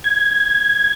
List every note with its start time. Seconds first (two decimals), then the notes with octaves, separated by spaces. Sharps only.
0.04 G#6